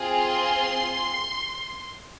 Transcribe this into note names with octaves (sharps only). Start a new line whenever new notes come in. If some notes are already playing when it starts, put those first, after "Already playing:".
Already playing: C4 F4 G#4
C6